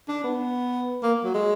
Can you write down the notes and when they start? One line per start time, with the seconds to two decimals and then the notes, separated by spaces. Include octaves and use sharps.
0.08 D4
0.24 B3
1.03 A#3
1.24 F#3
1.34 G#3